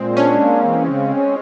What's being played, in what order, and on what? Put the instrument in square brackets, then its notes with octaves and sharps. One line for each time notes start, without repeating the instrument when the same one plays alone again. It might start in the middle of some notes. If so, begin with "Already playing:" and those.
Already playing: [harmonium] A#2 [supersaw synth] G#3 C4
[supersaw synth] C#4 [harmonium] D4
[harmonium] A#3
E3
C#3
C#4